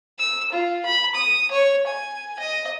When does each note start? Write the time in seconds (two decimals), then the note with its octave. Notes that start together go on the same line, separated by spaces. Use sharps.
0.19 E6
0.53 F4
0.85 B5
1.15 D#6
1.51 C#5
1.87 G#5
2.39 D#5